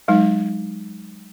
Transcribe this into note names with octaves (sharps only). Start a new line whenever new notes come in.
F#3 G#3 D#4